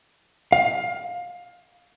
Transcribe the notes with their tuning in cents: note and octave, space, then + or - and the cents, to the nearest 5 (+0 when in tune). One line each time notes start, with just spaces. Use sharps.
F5 +20